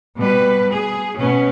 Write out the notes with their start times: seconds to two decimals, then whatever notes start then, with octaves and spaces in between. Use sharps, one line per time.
0.16 B2 G3 B4
0.71 G#4
1.18 B2 B3 C#4